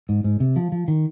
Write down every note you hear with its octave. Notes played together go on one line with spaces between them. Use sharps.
G#2
G#2
C3
F3
F3
D#3